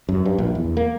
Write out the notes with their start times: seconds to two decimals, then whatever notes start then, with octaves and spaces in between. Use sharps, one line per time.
0.09 F#2
0.25 G2
0.38 A#1
0.55 E2
0.77 A#3